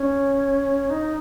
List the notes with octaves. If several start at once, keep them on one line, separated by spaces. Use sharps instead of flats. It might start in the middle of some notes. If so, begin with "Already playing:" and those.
Already playing: C#4
D#4